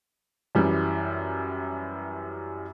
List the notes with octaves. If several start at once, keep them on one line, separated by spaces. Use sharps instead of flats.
F#2 E3 G3